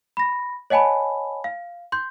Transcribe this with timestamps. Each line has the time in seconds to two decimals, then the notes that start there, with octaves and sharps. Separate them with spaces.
0.17 B5 A#6
0.70 C#5 D#5 F#5 G#5 A5 B5
1.44 F5
1.92 C6 G6